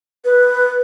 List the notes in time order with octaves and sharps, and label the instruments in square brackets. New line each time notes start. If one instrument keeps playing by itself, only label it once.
[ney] B4